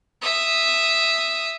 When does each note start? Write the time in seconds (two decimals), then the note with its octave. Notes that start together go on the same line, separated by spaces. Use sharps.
0.22 E5 D#6